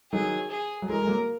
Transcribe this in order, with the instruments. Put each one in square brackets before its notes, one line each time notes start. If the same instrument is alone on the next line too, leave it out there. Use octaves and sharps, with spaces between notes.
[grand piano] D#3 F#3 [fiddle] G#4
[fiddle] G#4
[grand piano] F#3
[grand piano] E3 G#3 [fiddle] A#4
[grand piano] G#3
F#3 A#3